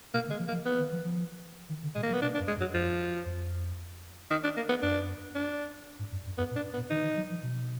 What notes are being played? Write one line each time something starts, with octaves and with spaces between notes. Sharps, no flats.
B2 A#3
D3
G#3
F3
A#3
F3
B3
D#3
F3
F3
D#3
D3
A#2 G#3
A#3
F#3
B3
B2 D4
D4
F#2
G#3
F#2
F#3
F2 F3
F2
D#3
D4
A#3
B3
F#2 D4
D4
G#2
F#2
F#2
F#2 B3
A#2
D4
B3
A#2
D#3 D#4
D#3
F#3
F3
B2